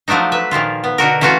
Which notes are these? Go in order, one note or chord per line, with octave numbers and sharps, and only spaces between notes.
F3 F#3 A3 D4 D#4
B4 E5
A#2 D#3 F3 F4
B3
B2 D3 F#4 A#4
E3 A3 C#4 F4 F#4